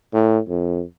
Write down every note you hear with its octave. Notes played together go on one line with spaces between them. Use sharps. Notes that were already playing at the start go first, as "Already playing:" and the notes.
A2
F2